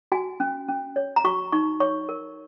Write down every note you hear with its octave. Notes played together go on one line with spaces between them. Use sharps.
F#4 G#5
C#4
C#4
C#5
A#5
F#4 C#6
D#4 C#6
C#5 C#6
A#4